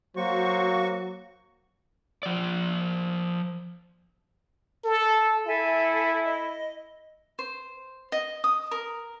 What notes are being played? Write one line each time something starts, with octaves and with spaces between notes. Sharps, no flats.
F#3 A#3 F#4 C5 C#6
F3 D5
A4
E4 A4 E5 G#5
D#5
C5
D#5
D#6
A#4